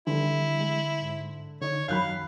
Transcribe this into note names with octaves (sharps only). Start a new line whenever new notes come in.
D3 E3 G3 E4
G#3
G#2
D3 D#4 C#5
F#2 D#3 F#3 F5 B5 F#6 G6